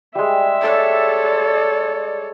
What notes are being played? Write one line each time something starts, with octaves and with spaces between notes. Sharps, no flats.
G3 G#3 E5
A4 C#5 D5